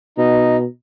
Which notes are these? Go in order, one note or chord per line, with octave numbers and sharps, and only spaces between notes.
B2 D#4